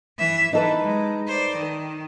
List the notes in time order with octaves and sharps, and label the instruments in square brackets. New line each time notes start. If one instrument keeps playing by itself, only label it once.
[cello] E3 E5
[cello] E3 [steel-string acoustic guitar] D#4 A4 B4
[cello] G#3
C5 D5
D#3